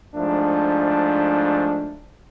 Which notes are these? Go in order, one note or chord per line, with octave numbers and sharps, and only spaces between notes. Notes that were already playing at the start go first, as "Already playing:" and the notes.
G#2 F3 A3 D4